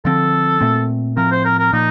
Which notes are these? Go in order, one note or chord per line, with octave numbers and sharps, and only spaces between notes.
D3 F3 C4 A4
A#2 A3 C4
A2 F3 C4 A#4
C5
A#4
A#4
A#2 F3 A#3 D#4